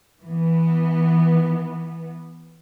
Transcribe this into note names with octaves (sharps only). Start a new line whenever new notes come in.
E3 B3